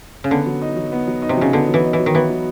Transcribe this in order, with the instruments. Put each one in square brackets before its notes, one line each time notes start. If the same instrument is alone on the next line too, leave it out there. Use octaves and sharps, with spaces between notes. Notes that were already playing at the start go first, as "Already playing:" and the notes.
[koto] C#3
[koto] D3 [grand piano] B3
[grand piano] F#3
D#4
F#3
B3
F#3
D#4
[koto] C3
[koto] C#3 [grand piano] F#3
[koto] D3 [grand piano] B3
[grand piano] F#3
[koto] E3
[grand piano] D#4
[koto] E3
[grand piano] F#3
[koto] D#3
[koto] E3 [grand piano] B3
[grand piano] F#3